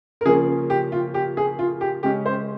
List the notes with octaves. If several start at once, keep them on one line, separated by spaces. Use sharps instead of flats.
A#4
C#3 F3 A#3 C#4 G#4
G4
F4
G4
G#4
F4
G4
C#3 G#3 C#4 G4
C5